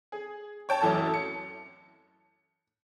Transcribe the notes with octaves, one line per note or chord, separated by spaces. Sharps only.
G#4
C#5 G5 A5
A1 F#2 E3 A4 A5
C#7